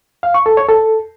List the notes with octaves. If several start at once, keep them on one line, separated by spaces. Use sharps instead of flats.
F5
C#6
A4
C#5
A4